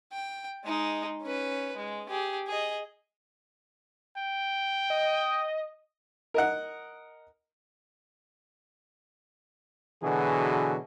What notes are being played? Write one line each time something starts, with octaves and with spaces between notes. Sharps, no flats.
G5
G#3 D#4
C#4 B4
G#3
G4 G#4
G#4 D#5
G5
D#5
A#4 D#5 F#5
B2 D3 E3 F#3 F#4 G#4